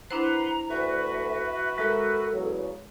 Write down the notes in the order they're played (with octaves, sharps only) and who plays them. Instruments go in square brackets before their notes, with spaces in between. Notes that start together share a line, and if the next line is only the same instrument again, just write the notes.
[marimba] D4 E4 C5 [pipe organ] B4 F#5 C6 [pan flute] A#5
[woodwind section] D2 [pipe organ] F#4 B4 [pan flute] E5
[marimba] G#3 [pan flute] A4 [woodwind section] A#4 E5
[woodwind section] E2 C#3 F#3